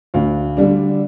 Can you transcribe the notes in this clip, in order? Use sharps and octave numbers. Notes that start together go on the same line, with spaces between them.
D2 F5
D3 G3 D4